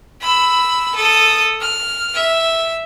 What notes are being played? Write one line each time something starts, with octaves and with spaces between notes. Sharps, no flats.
B5 E6
A4 D#6
F6
E5